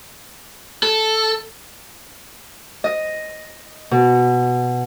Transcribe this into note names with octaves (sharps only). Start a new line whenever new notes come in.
A4
D#5
B2